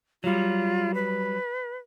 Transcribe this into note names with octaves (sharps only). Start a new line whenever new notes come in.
F#3 G3 F4
B4